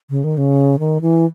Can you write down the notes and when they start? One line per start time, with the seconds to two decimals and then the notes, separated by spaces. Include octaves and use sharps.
0.10 C#3
0.24 D#3
0.37 C#3
0.79 D#3
1.01 E3